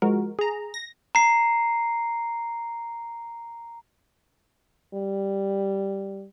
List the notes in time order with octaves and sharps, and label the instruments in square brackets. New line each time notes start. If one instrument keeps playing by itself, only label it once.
[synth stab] F3 G#3 F#4 A#4
G#4 A#5
A#6
[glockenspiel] A#5 C7
[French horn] G3